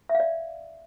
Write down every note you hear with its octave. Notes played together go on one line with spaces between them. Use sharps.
E5
F5
D5